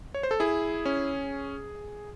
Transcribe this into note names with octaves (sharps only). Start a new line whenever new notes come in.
C#5
C5
A4
E4 G#4
C#4